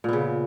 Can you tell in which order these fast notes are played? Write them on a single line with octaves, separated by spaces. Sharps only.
A#2 B3 C#3